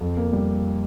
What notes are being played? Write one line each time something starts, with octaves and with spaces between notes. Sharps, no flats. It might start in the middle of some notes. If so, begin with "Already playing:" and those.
F2
A#3
G3